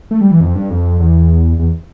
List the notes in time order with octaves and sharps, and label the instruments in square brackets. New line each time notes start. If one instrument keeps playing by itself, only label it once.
[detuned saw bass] A3
G3
E3
F2
G2
F2
E2
E2